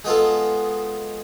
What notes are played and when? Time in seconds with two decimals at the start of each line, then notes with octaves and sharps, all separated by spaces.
0.05 G#3 B3 F4 A4